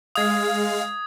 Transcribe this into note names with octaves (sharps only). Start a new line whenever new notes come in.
G#3 F5 D#6 G#6